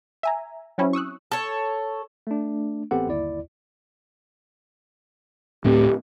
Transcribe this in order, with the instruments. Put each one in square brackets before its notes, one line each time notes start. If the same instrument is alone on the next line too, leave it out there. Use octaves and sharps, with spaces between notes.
[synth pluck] E5 G#5 A#5
F#3 C4 C#4 E4
C#6 D#6 E6 F#6
[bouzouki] A4 C#5
[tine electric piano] A3 D4
A1 B3 C4 G4 A4 F#5
G1 D#2 E4 D5
[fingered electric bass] D1 A2 C4 [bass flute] G4